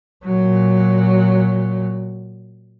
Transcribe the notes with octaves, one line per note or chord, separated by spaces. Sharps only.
A#2 F#3